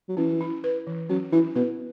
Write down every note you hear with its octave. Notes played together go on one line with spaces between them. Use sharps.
F#3
E3 C#4
E4
B4
E3
F#3 C#4
E3 E4
B2 B4